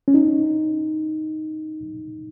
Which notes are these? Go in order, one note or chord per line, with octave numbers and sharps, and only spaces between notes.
C#4
D#4